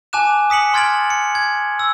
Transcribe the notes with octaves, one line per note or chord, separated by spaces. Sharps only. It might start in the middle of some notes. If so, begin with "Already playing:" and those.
G#5 A5 D6 F#6 E7
D#6 B6 C#7 F#7
C6 F6 G#6 A6 D7 F#7
C#7
G#6
E6